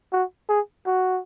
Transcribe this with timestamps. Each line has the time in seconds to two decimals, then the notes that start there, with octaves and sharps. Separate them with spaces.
0.13 F#4
0.49 G#4
0.87 F#4